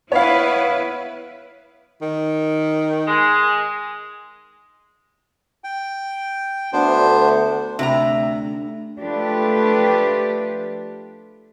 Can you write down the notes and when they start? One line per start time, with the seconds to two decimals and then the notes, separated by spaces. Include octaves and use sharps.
0.12 B3 E4 B4 C#5 F5
2.02 D#3
3.08 G#3
5.64 G5
6.73 D2 B3 D4 C5
7.79 D2 C3 G4 E5 A#5
8.99 F3 A3 D4 F4 G4 B4